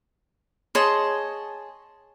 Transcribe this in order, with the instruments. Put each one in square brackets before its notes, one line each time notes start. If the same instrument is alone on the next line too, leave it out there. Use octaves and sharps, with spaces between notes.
[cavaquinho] G#4 C6 [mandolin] C#5 D#5 A5